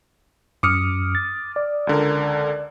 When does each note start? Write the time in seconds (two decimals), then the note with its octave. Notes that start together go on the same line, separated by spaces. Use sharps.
0.63 F#2 D6 D#6 F6 C#7
1.15 A6
1.56 D5
1.87 C#2 D3 A#4